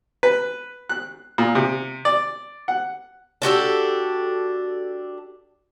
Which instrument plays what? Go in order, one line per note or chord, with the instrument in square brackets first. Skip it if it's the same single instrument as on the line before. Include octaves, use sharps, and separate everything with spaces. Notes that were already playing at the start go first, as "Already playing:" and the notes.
[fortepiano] B4
F#6
A#2
C3
D5
F#5
[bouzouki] D4 F#4 G4 A4